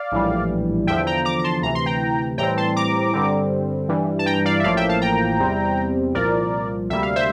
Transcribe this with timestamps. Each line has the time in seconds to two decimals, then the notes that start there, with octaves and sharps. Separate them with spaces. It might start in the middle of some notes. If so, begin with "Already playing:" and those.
Already playing: D5 F5
0.12 A#1 A2 E3 G3
0.87 E2 D3 F3 E5 G5
1.07 G5 A#5
1.25 A#5 D6
1.39 A#5
1.44 A5 C6
1.62 D2 C3 E3 A#5
1.75 C6
1.86 G5 A#5
2.38 A2 E3 G3 C4 G5 A#5
2.57 A5 C6
2.76 A#5 D6
3.13 G2 D3 G3 C4
3.89 G2 E3 G3
4.19 A5
4.26 G5 A#5
4.45 D5 F5
4.60 E5
4.64 A1 A2 F3 A#3 D5 F5
4.77 E5 G5
4.89 F5 A5
5.01 G5 A#5
5.40 E2 C3 G3 C4
6.15 C2 A#2 F3 A#4 D5
6.90 D2 C3 G3 A#3 E5
7.03 F5
7.16 C5 E5